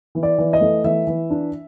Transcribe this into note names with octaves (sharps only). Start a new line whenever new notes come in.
E3
D5
E3
D#5
A3
E3 E5
E3
D4